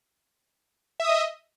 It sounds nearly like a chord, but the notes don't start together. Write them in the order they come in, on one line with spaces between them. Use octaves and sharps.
E5 D#6 D#5